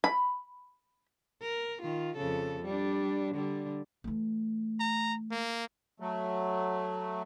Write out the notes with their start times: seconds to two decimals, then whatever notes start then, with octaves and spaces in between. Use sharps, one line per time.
0.04 B5
1.42 A#4
1.82 D#3 F4
2.17 F2 C#3 A4
2.65 G3 D4
3.35 D3 G3
4.04 E3 A3
4.80 A#5
5.31 A#3
6.00 F#3 A3